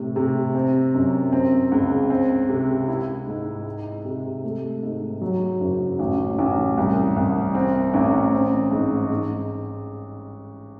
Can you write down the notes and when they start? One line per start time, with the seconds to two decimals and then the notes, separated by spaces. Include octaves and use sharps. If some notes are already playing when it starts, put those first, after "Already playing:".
Already playing: A2 C3
0.16 C3
0.55 C4
0.94 F#2
1.33 C4
1.72 C#2
2.10 C4
2.49 C3
2.88 E4
3.27 G#2
3.66 D#4
4.05 C3
4.44 A3
4.83 G#2
5.21 F#3
5.60 F#1
5.99 A1
6.39 A1
6.77 C2
7.16 C2
7.54 C4
7.94 A1
8.33 C4
8.71 G#2
9.10 G#2